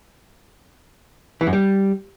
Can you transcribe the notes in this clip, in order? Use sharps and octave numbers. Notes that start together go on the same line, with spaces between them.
E3
F#2
G3